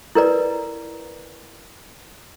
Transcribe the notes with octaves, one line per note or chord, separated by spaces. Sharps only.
E4 A#4 B4 D5